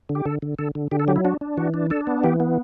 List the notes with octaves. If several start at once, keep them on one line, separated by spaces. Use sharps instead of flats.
D3
G4
D3 A4
D3
D3 A4
D3
D3 G4
A4
F#3 G4
E4
D4 F#4
D4
E3 F#4
D4
D4 A4
B3
E3 G4
B3